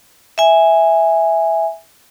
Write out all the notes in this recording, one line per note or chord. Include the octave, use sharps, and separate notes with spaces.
E5 G#5